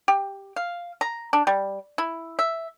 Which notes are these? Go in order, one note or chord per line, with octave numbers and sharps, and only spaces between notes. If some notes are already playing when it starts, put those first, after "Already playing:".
G4
F5
A#5
D4
G3
E4
E5